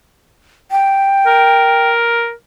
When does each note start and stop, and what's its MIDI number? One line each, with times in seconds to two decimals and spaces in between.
0.71 1.90 79
1.27 2.32 70